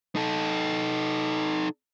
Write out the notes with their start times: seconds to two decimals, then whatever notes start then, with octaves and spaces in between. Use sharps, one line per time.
0.16 D#4 A4